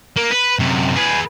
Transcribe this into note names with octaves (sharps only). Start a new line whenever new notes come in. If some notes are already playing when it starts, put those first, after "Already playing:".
A#3
B4
F#2 C3
G#4 B4